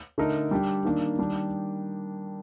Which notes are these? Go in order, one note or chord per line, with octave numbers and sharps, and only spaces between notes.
D3 A3 D#4 A#4
G3 D4 G4
D#3 A#3 D4
D#3 G3 D4 G4